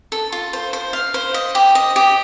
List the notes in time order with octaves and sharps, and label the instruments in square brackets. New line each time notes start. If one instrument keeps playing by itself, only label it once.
[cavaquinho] A4
F4
C5
C5
F5
C5
D#5
G4
D#5
G4